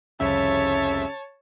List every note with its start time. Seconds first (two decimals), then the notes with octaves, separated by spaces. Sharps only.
0.20 C2 F2 C#3 C#5 E5 A5